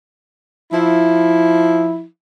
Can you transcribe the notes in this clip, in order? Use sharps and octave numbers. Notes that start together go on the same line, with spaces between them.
F3 E4